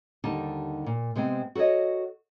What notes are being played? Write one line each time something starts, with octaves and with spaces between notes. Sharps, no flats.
D#2 D3 G3 D#4 A5
A#2
C3 G#3 B3 C4
F#4 A4 B4 C#5 D#5